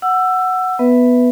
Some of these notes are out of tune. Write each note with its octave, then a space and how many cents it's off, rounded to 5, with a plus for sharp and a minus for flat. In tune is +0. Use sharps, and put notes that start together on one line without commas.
F#5 +0 E6 +15
B3 +0 B4 +0 E5 +0